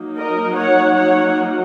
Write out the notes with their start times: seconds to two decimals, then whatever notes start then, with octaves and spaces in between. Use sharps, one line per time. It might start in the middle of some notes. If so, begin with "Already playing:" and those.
Already playing: F#3 A#3 D#4
0.17 A#4 D#5
0.56 C#5 F#5
0.96 C#5 F#5